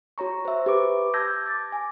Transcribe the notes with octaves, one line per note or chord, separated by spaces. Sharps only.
F#4 C#5 A#5 C#6
C5 E5
G4 B4 D6
A5 E6 G6 G#6 A#6
D6 A6
G#5